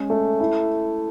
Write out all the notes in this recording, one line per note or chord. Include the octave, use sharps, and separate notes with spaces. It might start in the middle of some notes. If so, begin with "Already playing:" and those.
Already playing: G#3 C#4
A3
E4